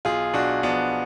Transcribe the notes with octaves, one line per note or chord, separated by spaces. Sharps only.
B1 F4 G#4
B1 D4 F#4
F3 B3 D4